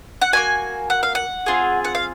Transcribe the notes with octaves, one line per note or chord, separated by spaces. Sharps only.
F#5
A#3 C#4 F#4 G#5
F#5
F5
F#5
C4 F4 G#4
F#5
F5